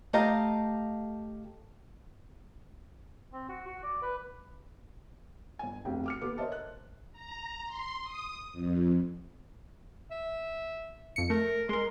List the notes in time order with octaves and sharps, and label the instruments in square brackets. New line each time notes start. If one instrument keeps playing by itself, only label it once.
[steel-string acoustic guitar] A3 G4 D#5 F5 A5 A#5
[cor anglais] C4
F#4
F#4
D5
B4
[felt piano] G1 G#5
F1 B1 C3 G5
D6 F6 C#7
D#2 B3 A4 D6
A#4 C5 C#5 D#5 E5 A5
F#6
[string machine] A#5
C6
D#6
F2
[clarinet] E5
[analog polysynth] F2 C#7
[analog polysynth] A3 [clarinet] A#4
[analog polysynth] G#3 A#4 [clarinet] C6